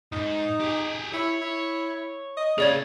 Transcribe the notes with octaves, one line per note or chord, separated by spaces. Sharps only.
E2 G#2 D#4
G4 G#4
E4 C#5
E4
D#5
C#3 A#3 C#4 G#4 D5 G#6